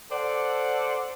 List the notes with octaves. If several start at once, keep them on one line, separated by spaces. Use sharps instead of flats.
A4 C5 D5 F#5